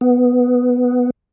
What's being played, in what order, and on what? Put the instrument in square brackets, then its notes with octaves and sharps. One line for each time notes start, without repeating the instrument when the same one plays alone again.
[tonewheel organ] B3